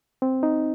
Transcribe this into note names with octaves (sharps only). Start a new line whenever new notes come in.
C4
D#4